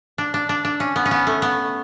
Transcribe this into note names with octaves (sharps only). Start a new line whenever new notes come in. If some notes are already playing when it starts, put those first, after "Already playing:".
D4
D4
D4
D4
C#4
B3
C#4
B3
A3
B3